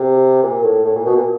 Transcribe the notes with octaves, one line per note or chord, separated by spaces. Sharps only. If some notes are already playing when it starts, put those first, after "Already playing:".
Already playing: C3
A#2
A2
A2
A#2
B2
A#2